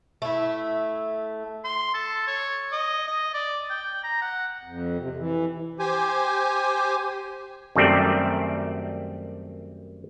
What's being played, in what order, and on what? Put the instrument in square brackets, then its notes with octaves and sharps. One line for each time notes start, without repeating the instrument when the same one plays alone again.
[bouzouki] A3 E4
[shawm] C6
A4
C#5
D#5
D#5
D5
G5
A#5
F#5
[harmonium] F2
C3
E3
[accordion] G4 C5 G#5
[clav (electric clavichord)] F#2 D#3 G3 A3 C4 D5